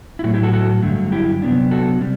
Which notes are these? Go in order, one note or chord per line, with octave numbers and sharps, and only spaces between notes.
E4
A2 F#3 A3 F#4
E4 G4
F#4 A4
F#4 A4
G2 D3 F#3 A3
E4 G4
C3 F#3 B3 D4
F#4 A4
C3 G3